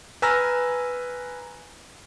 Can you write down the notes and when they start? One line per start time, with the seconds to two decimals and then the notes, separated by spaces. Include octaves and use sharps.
0.22 B4 G#5 A#5 E6 F6 A#6